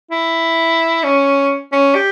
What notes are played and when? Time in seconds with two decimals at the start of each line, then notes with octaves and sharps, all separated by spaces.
0.11 E4
1.04 C#4
1.72 C#4
1.95 G4